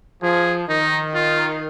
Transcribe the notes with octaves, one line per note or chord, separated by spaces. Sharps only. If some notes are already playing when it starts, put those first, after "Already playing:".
F3 G#4
D#3 D#4
F4